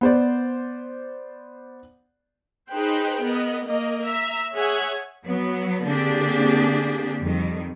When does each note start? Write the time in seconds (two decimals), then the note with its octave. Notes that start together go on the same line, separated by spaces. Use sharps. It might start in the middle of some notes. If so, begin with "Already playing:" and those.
0.01 B3 C5 D5
2.70 D#4 G#4 B4 C5 G5
3.22 B3 A#4 D#5
3.66 A#3 A#4 D#5
4.06 E5 A#5
4.53 G#4 C#5 E5 F#5 G#5
5.25 F#3 B3
5.86 D3 A#3 C4 D4 G4 G#4
7.22 F2 D#3 G3